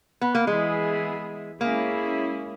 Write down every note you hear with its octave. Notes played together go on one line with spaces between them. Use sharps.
B3
A#3
E3 G#3 B3 E4 G#4
G#3 A#3 C#4 E4 G#4